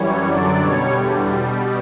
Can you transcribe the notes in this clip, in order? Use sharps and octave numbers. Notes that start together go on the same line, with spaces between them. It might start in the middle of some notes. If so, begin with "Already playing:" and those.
Already playing: F#2 E3 G3 C#5
F#2 D3 F#3 D5
B2 G3 C#5
E2 D3 G3 G4
B2 G3 G4